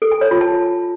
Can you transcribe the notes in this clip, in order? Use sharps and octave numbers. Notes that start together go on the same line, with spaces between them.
A4
G#5
C#5
F4
A5